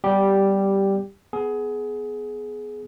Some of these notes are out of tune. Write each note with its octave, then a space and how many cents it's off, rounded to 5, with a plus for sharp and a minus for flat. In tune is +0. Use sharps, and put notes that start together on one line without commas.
G3 -10 B3 +5 G4 +0
B3 +10 G#4 +20